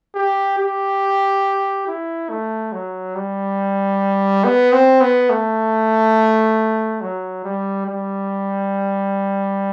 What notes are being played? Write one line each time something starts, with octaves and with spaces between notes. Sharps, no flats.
G4
G4
E4
A3
F#3
G3
B3
C4
B3
A3
F#3
G3
G3